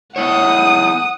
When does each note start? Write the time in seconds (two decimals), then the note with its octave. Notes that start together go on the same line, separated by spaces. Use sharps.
0.16 B3 E4 C#5 F#5 D#6